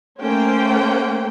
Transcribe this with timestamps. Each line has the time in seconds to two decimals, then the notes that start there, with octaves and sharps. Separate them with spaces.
0.20 A3 A#3 C#4 C5 G5